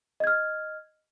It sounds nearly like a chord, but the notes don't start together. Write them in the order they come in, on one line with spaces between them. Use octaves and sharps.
D#5 G#6 F6